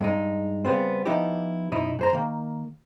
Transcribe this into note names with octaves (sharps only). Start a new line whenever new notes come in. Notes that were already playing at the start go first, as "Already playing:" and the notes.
G2 G#3 D#4
C#3 G3 B3 C4
F3 B3 D#4 E4 G4
F#2 B2 D#4 E4
F#2 C5 A#5
D#3 A#3